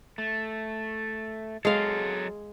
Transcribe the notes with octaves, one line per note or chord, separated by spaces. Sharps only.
A3
F#3 G#3 A4 F5